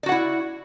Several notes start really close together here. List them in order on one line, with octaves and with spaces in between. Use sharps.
D5 F#4 F#5 E4